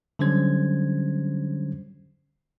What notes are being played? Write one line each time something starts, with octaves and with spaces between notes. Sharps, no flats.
D3 F#3 G3 C#4 C5 G#6